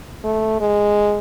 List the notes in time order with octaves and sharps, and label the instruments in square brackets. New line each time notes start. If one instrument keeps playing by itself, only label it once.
[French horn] A3
G#3